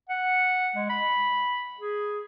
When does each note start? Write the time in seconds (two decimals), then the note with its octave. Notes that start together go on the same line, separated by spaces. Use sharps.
0.09 F#5
0.76 G#3
0.90 B5
1.80 G#4